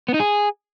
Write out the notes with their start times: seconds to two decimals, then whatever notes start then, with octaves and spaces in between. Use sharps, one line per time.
0.09 B3
0.14 D#4
0.20 G#4